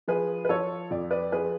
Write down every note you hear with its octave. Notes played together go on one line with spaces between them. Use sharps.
F3 G#4 B4
B4
F3 A4 C#5
F2 D5
B4 D5
F3 G#4 B4